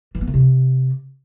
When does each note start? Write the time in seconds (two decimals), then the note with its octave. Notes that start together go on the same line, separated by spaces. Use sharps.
0.15 E3
0.21 B3
0.27 D3
0.34 C3